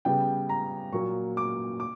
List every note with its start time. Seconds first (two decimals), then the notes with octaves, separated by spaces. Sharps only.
0.05 C#3 G3 B3 G5
0.49 A#5
0.92 A#2 F#3 A#3 C#6
1.37 D6
1.80 D6